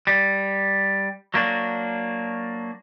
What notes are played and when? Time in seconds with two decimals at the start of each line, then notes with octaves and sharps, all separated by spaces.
0.07 G3
1.34 F#3 A#3 D4 F#4